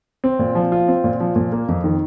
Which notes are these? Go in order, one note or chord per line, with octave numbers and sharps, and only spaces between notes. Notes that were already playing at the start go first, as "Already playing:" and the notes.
C4
A#2
F3
F4
C4
A#2
F3
A#2
A#3
F2
D#3